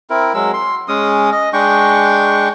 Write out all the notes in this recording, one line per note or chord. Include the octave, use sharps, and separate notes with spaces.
C4 E4 A#4
F#3 G#3 E6
C6
G#3 C#4 D#6
D#5
G#3 D4 G5 C#6